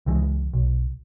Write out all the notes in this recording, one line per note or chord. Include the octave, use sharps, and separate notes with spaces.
C#2 E3 G#3
B1